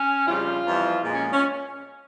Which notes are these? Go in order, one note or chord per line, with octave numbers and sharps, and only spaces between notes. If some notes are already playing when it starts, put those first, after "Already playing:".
Already playing: C#4
F2 C#3 G3 F4
F2 E3 G3
A#2 F3 G#3
C#4
C#4